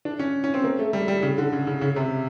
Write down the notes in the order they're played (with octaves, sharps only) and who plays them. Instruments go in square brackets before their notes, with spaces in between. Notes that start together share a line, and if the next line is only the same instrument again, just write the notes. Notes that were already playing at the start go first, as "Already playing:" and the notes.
[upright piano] D4
C#4
C#4
C4
A#3
A3
G3
G3
C#3
D3
C#3
C#3
C#3
C3